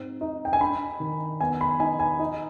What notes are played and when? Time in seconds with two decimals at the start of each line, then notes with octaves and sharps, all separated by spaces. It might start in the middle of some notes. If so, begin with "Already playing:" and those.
Already playing: G#2 C4
0.21 D#4
0.45 G5
0.53 G#5
0.60 D4 B5
1.00 D#3
1.40 B3 G#5
1.61 B5
1.80 D#4 G#5
1.99 G#5
2.19 D#4